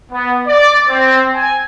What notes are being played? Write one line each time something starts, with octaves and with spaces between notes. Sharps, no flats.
B3
D5
C4
G#5